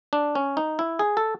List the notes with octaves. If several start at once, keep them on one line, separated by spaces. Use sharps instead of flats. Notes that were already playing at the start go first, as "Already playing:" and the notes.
D4
C#4
D#4
E4
G#4
A4